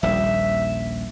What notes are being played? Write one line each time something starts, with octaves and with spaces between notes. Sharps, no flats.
D#1 A#1 G3 E5